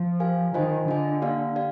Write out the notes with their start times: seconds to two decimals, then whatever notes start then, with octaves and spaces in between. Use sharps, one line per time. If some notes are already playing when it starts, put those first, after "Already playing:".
Already playing: F3
0.20 G4 A#4 F5 G#5
0.54 D#3 F4 C5 D#5 G#5
0.88 D3 F4 G#4 D#5 G#5
1.22 A#3 D4 G4 D5 F5
1.56 G4 D5 F5